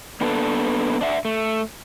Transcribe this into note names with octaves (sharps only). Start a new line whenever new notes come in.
A#3 B3 D4 A4 B4
D4 D5 E5 F#5
A3